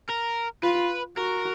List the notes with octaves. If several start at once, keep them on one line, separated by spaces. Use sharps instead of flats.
A#4
F4 B4
F#4 A#4